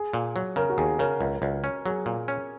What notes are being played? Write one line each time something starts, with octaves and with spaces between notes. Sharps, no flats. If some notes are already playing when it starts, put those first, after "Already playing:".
Already playing: G#4
A#2
F#3
C#3 A#4
F#4
D#2 G#4
C#3 A#4
C#2
C#2
C#4
F#3 G#4
A#2
C#4